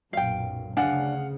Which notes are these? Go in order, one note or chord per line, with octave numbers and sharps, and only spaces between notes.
B1 F#2 A#2 F5 G5
D2 C#3 D4 F5 F#5 G#5